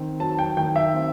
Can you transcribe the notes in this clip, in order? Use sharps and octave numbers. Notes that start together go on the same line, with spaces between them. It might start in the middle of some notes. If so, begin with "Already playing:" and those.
Already playing: D#3 C4
F#3 A5
G5
D#3 G5
E5
C4